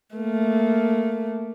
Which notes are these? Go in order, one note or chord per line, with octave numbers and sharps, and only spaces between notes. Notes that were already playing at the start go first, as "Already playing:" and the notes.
A3 A#3